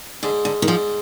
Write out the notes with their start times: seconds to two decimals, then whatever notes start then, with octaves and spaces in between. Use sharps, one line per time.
0.23 G#2 D3
0.45 D3
0.62 D#3
0.68 G#2 F3